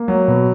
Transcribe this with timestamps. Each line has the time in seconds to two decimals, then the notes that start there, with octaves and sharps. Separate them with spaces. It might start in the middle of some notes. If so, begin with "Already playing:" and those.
Already playing: A#3
0.08 F#3
0.28 B2